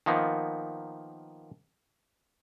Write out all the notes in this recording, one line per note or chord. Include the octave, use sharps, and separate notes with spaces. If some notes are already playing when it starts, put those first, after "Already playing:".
D#3 F3 A#3 B3